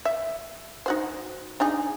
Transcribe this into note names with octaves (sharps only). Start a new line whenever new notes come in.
E5
D#4 F#4 C5
D4 D#4 G#4